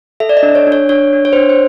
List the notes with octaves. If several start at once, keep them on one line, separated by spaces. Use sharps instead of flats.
A4 E5
D5
D#5
D4
C#5
D4
C#5
D4 C#5
D4
C#5
C5
D4
C5